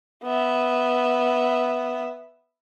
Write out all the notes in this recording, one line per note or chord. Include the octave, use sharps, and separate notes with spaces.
B3 E5